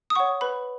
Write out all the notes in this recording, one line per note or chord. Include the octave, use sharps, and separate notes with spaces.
D#6
C#5 F#5 C#6
B4 B5